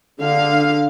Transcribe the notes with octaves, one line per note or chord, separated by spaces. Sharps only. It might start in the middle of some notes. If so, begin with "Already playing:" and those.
D3 F5